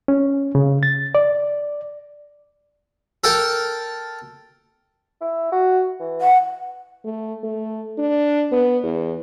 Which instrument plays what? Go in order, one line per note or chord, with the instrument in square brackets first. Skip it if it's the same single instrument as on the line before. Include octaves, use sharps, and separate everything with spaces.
[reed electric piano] C#4
C#3
A6
D5
[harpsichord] A4 A#4 G5 A5
[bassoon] E4
F#4
E3
[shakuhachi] F#5
[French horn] A3
A3
D4
B3
E2